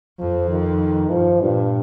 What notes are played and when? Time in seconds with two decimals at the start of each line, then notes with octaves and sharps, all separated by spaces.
0.19 F2 F3
0.49 D#3
1.11 G2 F3
1.42 G2 A#2